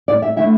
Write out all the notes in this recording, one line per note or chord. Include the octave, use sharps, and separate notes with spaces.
D5
E5
D3 A3 E4 E5